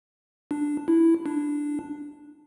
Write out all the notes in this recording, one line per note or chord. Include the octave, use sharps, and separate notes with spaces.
D4
E4
D4